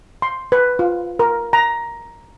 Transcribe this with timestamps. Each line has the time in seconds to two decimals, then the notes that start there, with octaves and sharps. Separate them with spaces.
0.22 C6
0.52 B4
0.79 F4
1.19 A#4
1.53 A#5